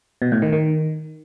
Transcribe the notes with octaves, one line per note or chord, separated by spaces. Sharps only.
B2
A2
D#3
D#3